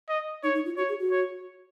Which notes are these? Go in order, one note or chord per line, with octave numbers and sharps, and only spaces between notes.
D#5
D#4 C#5
D#4
F4
F#4 C#5
G#4
F#4
C#5